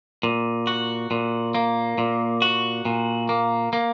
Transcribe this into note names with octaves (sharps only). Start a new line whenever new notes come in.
A#2
F#4
A#2
A#3
A#2
F#4
A#2
A#3
A#3